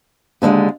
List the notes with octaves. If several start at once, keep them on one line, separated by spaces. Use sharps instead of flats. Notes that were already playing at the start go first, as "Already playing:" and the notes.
D#2 D3 F3 G#3